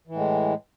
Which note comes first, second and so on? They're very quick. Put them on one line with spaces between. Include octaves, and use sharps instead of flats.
E3 A2 G#3